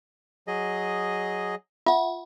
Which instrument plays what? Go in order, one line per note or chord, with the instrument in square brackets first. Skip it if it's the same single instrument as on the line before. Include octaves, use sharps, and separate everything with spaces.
[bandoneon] F#3 G#4 D#5
[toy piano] F4 [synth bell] E5 F#5